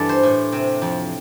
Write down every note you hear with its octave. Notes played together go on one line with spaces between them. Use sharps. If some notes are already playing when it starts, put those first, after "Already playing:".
Already playing: G2 E3 D4 A4
C5
A2
C3
F2